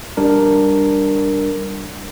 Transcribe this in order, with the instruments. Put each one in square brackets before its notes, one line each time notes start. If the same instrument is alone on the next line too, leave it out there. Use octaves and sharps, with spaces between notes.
[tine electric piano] G3 D4 A#4